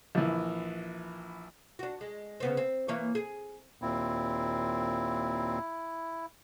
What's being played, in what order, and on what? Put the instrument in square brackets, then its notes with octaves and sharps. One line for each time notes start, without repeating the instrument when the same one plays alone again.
[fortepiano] A#1 E3
[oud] D4 F#4
G#3
C#3 B3 C4
C4
E3 A#3 C#5
G#4
[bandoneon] D#2 A#2 C4 [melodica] E4